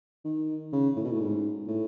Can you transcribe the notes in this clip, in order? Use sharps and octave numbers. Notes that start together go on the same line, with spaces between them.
D#3
C#3
A2
B2
A2
G#2
A2